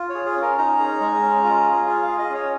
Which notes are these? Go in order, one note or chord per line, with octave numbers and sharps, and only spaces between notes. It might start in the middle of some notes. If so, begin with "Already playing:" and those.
Already playing: F4
C#5
G#4
G#4
C#4
A#4
D#4 A#5
G#4
G#3
C#4
F4
G#4
F4
F5
G#4
D#5
C#4 C#5